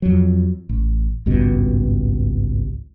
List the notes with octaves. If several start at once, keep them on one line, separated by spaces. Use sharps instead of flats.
F2 F#3
A1
G#1 C#2 G2 B2